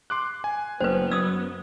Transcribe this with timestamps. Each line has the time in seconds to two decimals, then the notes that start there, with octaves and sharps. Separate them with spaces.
0.10 C6 D6 F#6
0.44 G#5
0.81 F#1 B3 B4 C5 G5
1.11 F#2 D#6 E6 G#6